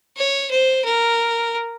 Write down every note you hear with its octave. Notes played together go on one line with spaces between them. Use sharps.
C#5
C5
A#4